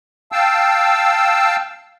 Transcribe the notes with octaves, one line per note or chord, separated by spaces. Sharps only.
F5 G5 A5 E6